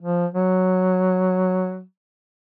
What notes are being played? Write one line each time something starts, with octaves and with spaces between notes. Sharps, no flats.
F3
F#3